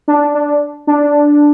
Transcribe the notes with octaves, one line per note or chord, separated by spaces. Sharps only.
D4
D4
D4